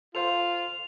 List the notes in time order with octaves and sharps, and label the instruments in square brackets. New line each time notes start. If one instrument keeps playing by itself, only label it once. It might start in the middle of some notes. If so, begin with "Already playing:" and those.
[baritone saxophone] F4 [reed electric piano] A4 C5 F5 [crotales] F7